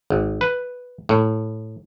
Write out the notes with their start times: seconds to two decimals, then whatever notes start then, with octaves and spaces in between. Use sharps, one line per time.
0.10 G#1
0.41 B4
1.09 A2